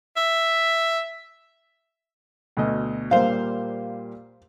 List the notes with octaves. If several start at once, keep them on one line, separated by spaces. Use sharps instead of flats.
E5
D2 B2 D#5
A#2 G3 A#3 C5 F5